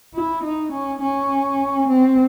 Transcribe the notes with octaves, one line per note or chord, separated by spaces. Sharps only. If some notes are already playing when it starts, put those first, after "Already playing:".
E4
D#4
C#4
C#4
C4